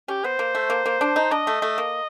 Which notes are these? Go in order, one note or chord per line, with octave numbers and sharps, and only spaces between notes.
C#4 G4
B3 C5
A#3
A3
A#3
A#3
D4
D#4
D4 D#5
A3
A3
A#3